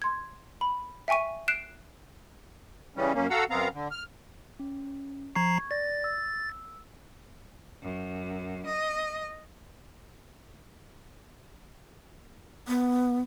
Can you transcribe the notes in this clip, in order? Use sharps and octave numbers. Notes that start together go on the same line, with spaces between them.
C6 G#6
B5
E5 G5 G#5 C#6 D#7
F#6 C7 D7 E7
C#3 E3 G3 C#4
F#2 A#3 C#4
F#4 A4 F5 F#5 A#5 E6
F#2 B3 C4 F5 A#5
D3
F6
C#4
F3 A#5 C#6 G#6 C7
D5 A6 A#6
E6
F#2
D#5
B3